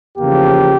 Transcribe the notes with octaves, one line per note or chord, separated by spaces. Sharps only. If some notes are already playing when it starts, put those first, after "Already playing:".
E2 C#3 F3 A#3 G4